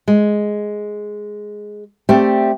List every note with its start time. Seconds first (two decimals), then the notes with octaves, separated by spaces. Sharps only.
0.08 G#3
2.09 A3 C4 G4 D5 E5